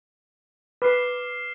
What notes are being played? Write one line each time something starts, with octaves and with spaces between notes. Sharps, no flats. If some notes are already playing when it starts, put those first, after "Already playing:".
B4 D6 F6 C7